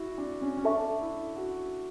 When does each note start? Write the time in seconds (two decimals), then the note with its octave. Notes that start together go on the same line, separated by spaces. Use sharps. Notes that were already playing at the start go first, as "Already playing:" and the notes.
Already playing: E4 F#4
0.18 D4
0.41 C#4
0.57 C#4
0.65 D4 A4 E5 A5 C#6
1.01 E4
1.36 F#4